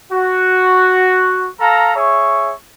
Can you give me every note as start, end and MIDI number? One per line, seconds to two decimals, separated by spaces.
0.12 1.49 66
1.60 1.95 69
1.60 1.95 77
1.60 1.95 82
1.96 2.53 68
1.96 2.53 73
1.96 2.53 76
1.96 2.53 85